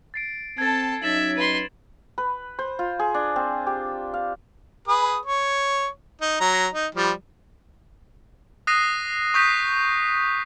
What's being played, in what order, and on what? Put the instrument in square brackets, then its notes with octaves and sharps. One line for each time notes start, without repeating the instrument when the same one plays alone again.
[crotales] A6 C7 D7
[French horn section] C4 [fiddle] A4 A5 [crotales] G#6 A6
[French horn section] F#3 C#4 D#4 [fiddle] E5 [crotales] A6 E7 F#7
[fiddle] B4 C6
[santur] B4
C5
F4
G#4
D4
C4
G4
F5
[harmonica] G#4 B4 D#6
C#5
D#4
F#3 A#5
D#4
F3 G3
[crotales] D#6 F#6 A#6 C7 D#7
C#6 D#6 G6 B6 C7